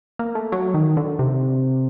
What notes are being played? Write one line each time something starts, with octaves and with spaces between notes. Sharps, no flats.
A#3
A3
F#3
D#3
D3
C3